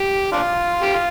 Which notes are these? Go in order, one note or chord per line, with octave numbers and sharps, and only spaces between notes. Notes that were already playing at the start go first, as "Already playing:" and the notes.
Already playing: G4
D4 F4
G4
F4